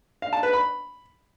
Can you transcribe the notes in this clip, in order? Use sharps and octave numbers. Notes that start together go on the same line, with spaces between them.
F5
A5
B4
B5